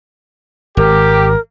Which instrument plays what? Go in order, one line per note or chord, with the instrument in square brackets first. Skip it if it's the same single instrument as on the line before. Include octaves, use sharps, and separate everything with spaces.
[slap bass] G#1 [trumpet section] G4 [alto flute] A#4